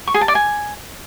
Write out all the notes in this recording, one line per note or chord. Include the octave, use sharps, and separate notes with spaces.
C#6
G#4
A5
D5
G#5